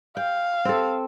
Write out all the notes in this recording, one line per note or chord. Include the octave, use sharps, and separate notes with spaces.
F5 G5
C4 A4